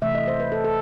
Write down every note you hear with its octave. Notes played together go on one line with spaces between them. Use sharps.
C3 E3 A3 E5
D#5
C5
B4
A4
A4